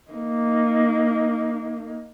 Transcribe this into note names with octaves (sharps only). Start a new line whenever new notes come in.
A#3 D#4